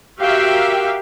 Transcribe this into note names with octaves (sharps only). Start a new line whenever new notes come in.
F#4 G4 A#4 E5 F5 G5